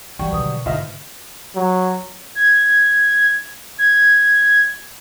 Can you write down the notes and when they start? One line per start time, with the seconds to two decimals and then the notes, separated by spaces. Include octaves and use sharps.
0.19 E3 F#3 G3 G5 C#6
0.32 B2 D3 D#3 D#6
0.66 G#2 D3 E4 F4 D#5 E5
1.55 F#3
2.35 G#6
3.78 G#6